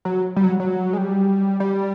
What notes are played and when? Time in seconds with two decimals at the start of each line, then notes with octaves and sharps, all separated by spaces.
0.05 F#3
0.36 G3
0.44 F#3
0.60 F#3
0.93 G#3
0.98 G3
1.60 G3